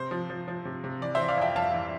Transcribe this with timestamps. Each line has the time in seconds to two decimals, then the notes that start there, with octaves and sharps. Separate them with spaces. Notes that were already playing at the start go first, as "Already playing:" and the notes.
Already playing: C3 C5
0.11 F3
0.30 F3
0.48 F3
0.65 C3
0.84 C3
1.01 E3 D5
1.15 C5 E5
1.20 E3
1.28 D5 F5
1.37 F2 E5 G5
1.56 F2 F5 A5
1.73 E3